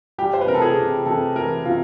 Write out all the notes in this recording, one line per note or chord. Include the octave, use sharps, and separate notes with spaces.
G3 G4
C5
B4
C3 A#4
A4
G#4
C3
C3 A4
E3 A#4
C3 F4